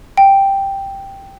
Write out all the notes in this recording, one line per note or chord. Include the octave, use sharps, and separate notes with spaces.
G5